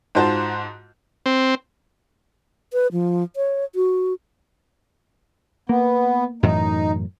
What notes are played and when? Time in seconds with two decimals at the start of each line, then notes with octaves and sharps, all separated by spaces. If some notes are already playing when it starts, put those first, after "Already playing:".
0.15 G#2 F4 F#4 C5 A5
1.26 C4
2.73 B4
2.92 F3
3.36 C#5
3.75 F#4
5.69 A#3 B3
6.43 F#2 A2 E3 D#4